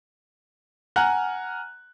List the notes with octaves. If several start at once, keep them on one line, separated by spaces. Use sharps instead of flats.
F#5 G#5 A#5 F6 F#6